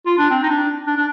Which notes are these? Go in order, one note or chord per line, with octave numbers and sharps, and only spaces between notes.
F4
D4
C4
D#4
D4
D4
D4